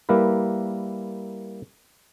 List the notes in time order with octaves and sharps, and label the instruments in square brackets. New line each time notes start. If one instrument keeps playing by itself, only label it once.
[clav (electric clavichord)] G3 A#3 E4 A#4 B4